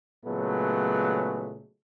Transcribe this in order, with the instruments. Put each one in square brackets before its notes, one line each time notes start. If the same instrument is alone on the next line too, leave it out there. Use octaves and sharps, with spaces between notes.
[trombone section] A#2 C#3 F#3 G#3 A3 B3